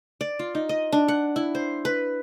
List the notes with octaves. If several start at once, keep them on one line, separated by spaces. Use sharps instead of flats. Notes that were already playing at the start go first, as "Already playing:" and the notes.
D5
F4
D#4
D#5
D4
F#5
E4
C5
B4